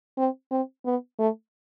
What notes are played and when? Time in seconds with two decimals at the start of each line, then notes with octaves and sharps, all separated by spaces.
0.18 C4
0.51 C4
0.86 B3
1.19 A3